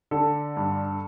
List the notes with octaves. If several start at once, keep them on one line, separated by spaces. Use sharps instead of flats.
D3 A4
G2